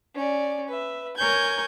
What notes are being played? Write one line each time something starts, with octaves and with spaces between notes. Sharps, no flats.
C#4 D5
B4 E5
A#4 C#5 G#5 G6 G#6